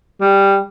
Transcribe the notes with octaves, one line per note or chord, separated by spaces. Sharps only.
G3